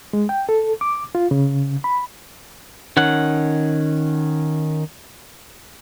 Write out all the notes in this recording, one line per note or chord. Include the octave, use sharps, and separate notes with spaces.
G#3
G5
A4
D6
F4
C#3
B5
D#3 C#4 F#5